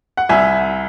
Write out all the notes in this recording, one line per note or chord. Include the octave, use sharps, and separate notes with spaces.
F#5
C2 E5 G#5